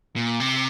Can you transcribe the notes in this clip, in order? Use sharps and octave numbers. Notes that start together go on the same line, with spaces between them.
A#2
C3